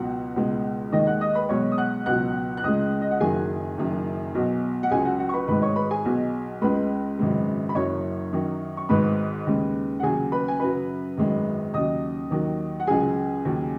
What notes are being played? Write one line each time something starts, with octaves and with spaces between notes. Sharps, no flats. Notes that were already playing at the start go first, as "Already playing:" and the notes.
Already playing: C#2 B2 F#3 F#4 F#5
C#2 B2 G#3
D#2 D#3 G#3 D#4 D#5
F#5 F#6
D#5 D#6
B4 B5
B1 B2 G#3 C#5 C#6
D#6
F#5 F#6
C#2 B2 F#3 F#5 F#6
F#6
C#2 C#3 G#3 D#5 D#6
D#5
F#5
F#1 F#2 D#3 F#3 G#4 G#5
F#1 F#2 D#3
B1 B2 F#3
F#5
C#2 C#3 F#3 G#4 G#5
F#4 F#5
F#4 F#5
C#6
B4 B5
G#1 G#2 G#3 B4 B5
C#5 C#6
B4 B5
G#4 G#5
B1 B2 F#3
C#2 C#3 G#3 B4 B5
G#1 F#2 C#3 G#3
B5
F#1 F#2 F#3 C#5 C#6
F#2 D#3 F#3
C#6
G#1 G#2 G#3 B4 B5
D#2 C#3 G#3
F#5
D#2 C#3 F#3 G#4 G#5
B4 B5
G#5
F#2 C#3 F#3 B4 B5
G#1 F#2 D#3 G#3
D#2 C#3 F#3 D#5 D#6
D#2 D#3 F#3
F#5
C#2 C#3 F#3 G#4 G#5
D#2 C#3 F#3